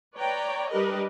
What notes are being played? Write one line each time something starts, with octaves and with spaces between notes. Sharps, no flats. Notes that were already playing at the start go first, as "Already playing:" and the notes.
B4 C#5 D5 G5 A#5
G3 D4 G4 A#4 B4 D#5